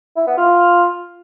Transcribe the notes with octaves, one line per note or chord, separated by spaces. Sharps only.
E4
B3
F4